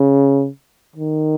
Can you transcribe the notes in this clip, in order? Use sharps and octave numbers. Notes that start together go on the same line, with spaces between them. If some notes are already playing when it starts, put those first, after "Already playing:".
Already playing: C#3
D#3